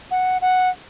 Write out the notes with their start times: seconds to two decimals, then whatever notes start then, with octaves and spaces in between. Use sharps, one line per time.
0.11 F#5
0.42 F#5